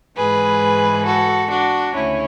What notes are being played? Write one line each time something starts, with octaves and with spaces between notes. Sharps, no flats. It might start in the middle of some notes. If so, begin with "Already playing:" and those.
G#2 E3 G#4 B4
F#4 A4
D4 F#4
D2 C#3 C#4 E4